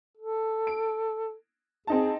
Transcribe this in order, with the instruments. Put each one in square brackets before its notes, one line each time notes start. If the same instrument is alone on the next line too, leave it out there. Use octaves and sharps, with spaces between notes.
[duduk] A4
[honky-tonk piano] D7
[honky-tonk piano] C4 D#4 A5 [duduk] G#4